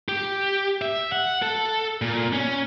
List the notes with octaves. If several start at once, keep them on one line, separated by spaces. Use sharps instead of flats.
G4
E5
F#5
A4
A#2
C#4